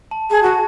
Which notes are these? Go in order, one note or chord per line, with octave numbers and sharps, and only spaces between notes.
A5
G#4 A5
F#4 A5